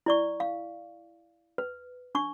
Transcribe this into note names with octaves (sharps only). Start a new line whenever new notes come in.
E4 D5 C#6
F5
B4
D4 C#6